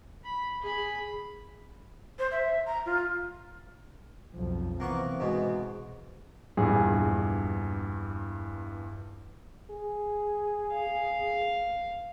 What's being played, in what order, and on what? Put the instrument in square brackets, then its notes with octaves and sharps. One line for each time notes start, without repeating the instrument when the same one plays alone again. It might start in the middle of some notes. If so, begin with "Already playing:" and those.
[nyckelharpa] B5
G#4 B5
[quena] C5
E5
A#5
F4
[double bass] B1 F2
[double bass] C3 E3 [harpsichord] A#3 B3 C#6
[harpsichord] G#2 B2
[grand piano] A#1 E2 G2 G#4
[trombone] G#4
[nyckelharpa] F5